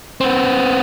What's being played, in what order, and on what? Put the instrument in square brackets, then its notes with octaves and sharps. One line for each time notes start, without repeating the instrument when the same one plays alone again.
[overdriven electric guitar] B3 C4